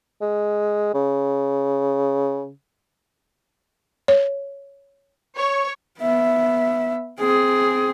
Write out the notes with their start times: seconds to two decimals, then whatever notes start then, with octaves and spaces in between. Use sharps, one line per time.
0.21 G#3
0.94 C#3
4.08 C#5
5.37 C#5
6.00 B3 E5
7.19 C4 G#4